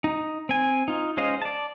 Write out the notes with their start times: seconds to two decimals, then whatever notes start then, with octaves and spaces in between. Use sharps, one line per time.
0.04 D#4
0.49 C4 G#5
0.88 D#4 F4
1.17 G#3 C#4 C5 D#5 F5
1.42 D5 A5